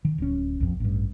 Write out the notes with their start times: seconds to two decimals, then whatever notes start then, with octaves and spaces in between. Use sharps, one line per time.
0.05 D#3
0.18 D1 C#4
0.60 A#1 F2
0.80 A1 G2